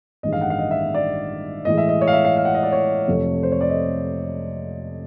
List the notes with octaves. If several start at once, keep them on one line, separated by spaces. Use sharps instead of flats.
A1 G2 D#3 G#3 D#5
F5
F#5
F5
D#5
E5
D5
A2 E3 G#3 D#5
E5
D#5
C#5
F5
E5
F5
F5
F#5
D#5
D5
C#5
F2 C3 F3 A3
C5
C#5
D5
D#5